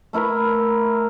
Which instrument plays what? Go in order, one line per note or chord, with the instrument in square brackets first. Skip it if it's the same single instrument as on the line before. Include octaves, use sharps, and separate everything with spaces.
[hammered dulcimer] A3 E4 A#4 B4